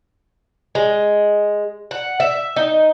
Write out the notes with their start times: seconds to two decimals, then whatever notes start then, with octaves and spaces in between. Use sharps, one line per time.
0.75 G#3
1.91 F#5
2.20 E5
2.56 D#4